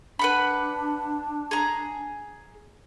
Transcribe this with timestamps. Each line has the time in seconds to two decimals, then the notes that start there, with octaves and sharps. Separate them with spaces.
0.19 D4 B4 F#5 B5
1.51 G#4 A#5